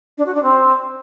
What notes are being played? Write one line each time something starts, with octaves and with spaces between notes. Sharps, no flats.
D4
F#4
D4
C4